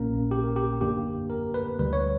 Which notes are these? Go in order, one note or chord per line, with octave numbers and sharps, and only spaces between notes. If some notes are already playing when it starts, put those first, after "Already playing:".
Already playing: A#1 A#2 A#3 C#4 A#4
G4
A#4
G4
F#2 D3 A#3 D4 G4
A#4
B4
D2 D3 G3 B4
C#5